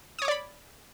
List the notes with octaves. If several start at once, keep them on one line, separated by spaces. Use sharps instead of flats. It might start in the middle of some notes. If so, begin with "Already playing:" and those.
C#5 D5 B5 D6 D#6